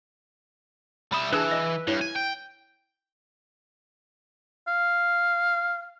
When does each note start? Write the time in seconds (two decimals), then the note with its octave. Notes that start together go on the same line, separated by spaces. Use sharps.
1.12 G3 E5 B5 D#6
1.33 E3 D4 G#4 B4 A5 E6
1.51 D#5 A#6
1.87 G2 E4 C#5
2.01 G#5
2.16 G5
4.68 F5